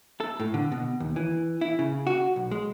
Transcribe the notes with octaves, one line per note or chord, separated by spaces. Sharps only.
A4
A2
D3
B2
D#2
E3
E4
C#3
F#4
B1
G#3